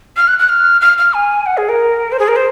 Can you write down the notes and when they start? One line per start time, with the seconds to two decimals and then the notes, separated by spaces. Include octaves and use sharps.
0.17 F6
0.28 F#6
0.39 F#6
0.49 F6
0.81 F6
0.98 F6
1.13 G#5
1.46 F#5
1.57 G#4
1.69 A#4
2.12 C5
2.19 G#4
2.28 A#4
2.36 C5